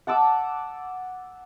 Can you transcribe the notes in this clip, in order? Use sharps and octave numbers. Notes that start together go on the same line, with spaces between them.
F#5 A5 D6 E6